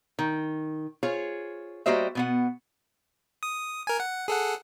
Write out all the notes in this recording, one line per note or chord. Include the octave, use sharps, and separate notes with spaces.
D#3
F4 G#4 C5 C#5
G3 A#3 F#4 C5 D#5 E5
B2 B3 F#5
D#6
A#4 G#5
F#5
G#4 A4 F#5